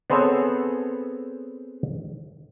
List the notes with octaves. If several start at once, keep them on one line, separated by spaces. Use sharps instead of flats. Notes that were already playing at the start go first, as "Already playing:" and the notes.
B3 C4 G#4 A4 C5 C#5